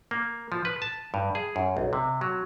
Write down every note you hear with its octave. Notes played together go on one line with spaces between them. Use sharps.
A#3
F3
B4
A5
G2
G#4
F#2
B1
C3
F#3